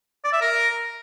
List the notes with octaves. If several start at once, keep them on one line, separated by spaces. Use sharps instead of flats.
D5
E5
A#4